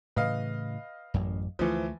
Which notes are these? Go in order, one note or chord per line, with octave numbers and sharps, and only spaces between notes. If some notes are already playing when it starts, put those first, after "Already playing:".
A2 C#3 E3 B4 D#5 F5
A1 F#2
D2 E3 F3 G#3 A3